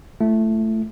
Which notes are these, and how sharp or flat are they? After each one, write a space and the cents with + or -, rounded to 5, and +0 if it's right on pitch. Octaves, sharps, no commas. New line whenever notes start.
A3 +0 E4 +40